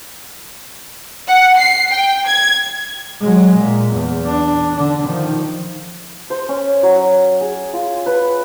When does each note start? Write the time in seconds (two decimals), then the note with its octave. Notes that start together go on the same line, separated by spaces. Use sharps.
1.27 F#5
1.57 C7
1.92 G5
2.27 G#6
3.22 F#3 G#3
3.59 A#2
3.95 E2
4.27 D4
4.77 D3 D4
5.08 D#3 F3
6.30 C5
6.49 C#4
6.83 F#3
7.41 G#4
7.73 F4
8.06 B4